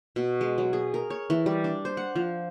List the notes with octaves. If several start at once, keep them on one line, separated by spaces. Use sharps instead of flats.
B2
G#3
F#3
G#4
A#4
C#5
E3
G3
D4
C5
F#5
F3